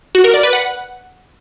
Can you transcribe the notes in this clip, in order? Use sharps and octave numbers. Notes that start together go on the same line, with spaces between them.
F#4
A#4
D5
B4
F#5